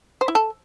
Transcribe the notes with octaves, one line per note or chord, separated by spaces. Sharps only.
C5
E4
A4